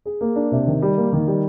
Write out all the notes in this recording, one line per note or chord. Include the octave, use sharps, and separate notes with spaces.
G#4
A#3
D4
C3
D#3
G3
A#3
D#3
G3